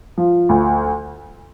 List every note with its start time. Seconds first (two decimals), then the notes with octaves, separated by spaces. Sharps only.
0.18 F3
0.49 D2